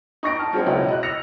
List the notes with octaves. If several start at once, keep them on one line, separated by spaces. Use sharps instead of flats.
D#4 C#6 A#6 D7
A5 F6
F3 F#3 G#3 C4 C#4
E1 C#2 F#3 E4 D#5
D#5 F#6
E6 A#6 C#7 F7